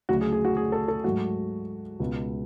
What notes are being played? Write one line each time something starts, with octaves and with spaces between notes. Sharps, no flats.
D2 C#3 F#3 A3 F#4
G#4
G#4
F#4
G#4
A4
A4
G#2 F#3 A3 F#4
C#2 B2 G#3